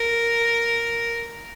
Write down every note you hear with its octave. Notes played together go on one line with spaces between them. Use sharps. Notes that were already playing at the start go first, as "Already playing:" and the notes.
Already playing: A#4